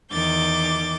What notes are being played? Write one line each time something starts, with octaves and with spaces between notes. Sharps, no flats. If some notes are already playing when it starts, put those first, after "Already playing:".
E2 D#3 D6 G6 A6